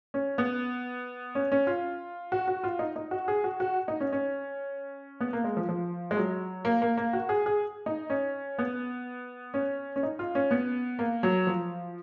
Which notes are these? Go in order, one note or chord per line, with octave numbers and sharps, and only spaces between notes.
C#4
B3
C#4
C#4
F4
F#4
F#4
F4
D#4
D#4
F#4
G#4
F#4
F#4
D#4
C#4
C#4
B3
A#3
G#3
F3
F3
G#3
F#3
A#3
A#3
A#3
F#4
G#4
G#4
D#4
C#4
B3
C#4
C#4
D#4
F4
C#4
B3
A#3
F#3
F3